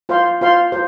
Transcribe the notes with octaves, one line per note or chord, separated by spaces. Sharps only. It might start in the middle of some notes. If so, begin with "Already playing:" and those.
F4 C5 F5 C6
F4 C5 F5 C6
F4 C5